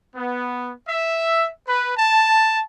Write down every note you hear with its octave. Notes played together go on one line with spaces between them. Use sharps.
B3
E5
B4
A5